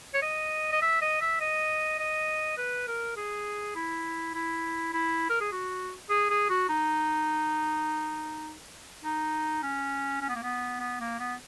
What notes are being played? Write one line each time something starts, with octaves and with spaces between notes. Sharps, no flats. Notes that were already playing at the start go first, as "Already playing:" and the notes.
C#5
D#5
D#5
E5
D#5
E5
D#5
D#5
B4
A#4
G#4
E4
E4
E4
A#4
G#4
F#4
G#4
G#4
F#4
D#4
D#4
C#4
C#4
B3
A#3
B3
B3
A#3
B3